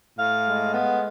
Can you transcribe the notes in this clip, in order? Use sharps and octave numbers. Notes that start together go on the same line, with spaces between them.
A2 F5
G#3
B3